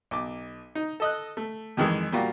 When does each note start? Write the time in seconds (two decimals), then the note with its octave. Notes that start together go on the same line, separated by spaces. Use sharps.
0.11 B1 D6
0.75 D#4
1.00 A4 D#5 F#6
1.37 A3
1.77 F2 D#3 E3 G#3
2.12 A#2 G3 A#3 F4 F#4